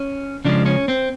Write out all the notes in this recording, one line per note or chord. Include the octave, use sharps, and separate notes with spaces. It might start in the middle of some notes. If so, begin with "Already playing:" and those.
Already playing: C#4
C#3 F3 G#3 D4
C#4
C4